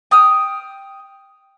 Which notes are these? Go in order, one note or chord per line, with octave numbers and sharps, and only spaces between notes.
G5 D#6 F6